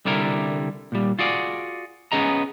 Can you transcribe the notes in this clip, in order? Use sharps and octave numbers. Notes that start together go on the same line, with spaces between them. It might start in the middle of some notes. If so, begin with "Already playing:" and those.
C2 D3 G3 E4 A#4
A#2 G3
F4 F#4 G#4 D5
B3 C#4 G#4 D#5 A#5